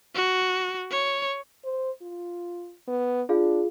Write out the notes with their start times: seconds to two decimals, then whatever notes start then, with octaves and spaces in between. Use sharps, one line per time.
0.15 F#4
0.91 C#5
1.65 C5
2.02 F4
2.88 B3
3.29 D4 F4 G#4 F5